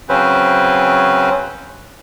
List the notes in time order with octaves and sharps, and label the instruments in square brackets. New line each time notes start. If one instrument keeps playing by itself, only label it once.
[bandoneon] C#3 F#3 C4 C#4 B4 C5